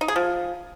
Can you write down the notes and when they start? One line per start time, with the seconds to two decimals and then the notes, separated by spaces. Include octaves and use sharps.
0.01 D#4
0.08 G#4
0.16 F3